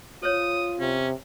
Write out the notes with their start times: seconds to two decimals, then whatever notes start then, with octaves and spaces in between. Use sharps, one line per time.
0.23 F4 C5 C#5 D#6
0.80 C3 C#4